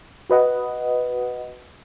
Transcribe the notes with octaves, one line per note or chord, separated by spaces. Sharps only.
F#4 B4 D#5 F#5